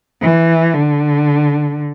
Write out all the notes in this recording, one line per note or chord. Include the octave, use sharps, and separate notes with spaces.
E3
D3